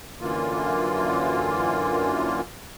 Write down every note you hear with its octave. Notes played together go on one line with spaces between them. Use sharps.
F#2 D3 E3 A#3 F4